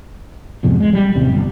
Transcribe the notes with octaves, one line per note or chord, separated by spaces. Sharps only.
C2 F2 G#2 B2
G#3
G3
A1 D#2 C3
G1 G3